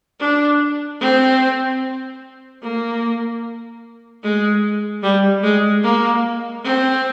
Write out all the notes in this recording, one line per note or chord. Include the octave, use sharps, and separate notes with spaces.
D4
C4
A#3
G#3
G3
G#3
A#3
C4